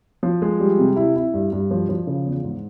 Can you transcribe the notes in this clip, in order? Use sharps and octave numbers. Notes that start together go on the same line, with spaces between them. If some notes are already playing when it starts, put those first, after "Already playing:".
F3
G#3
G3
C3
E4
E4
G2
G2
F3
F3
C#3
E2
G#2